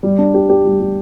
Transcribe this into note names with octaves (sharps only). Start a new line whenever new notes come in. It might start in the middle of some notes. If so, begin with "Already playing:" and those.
G3
D4
G4
G4
G3
G3